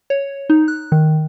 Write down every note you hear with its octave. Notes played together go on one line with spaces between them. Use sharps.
C#5
D#4
F#6
D#3